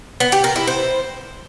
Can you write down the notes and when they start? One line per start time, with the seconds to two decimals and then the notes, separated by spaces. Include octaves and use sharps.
0.20 B3
0.32 G4
0.44 A#4
0.56 E4
0.67 C5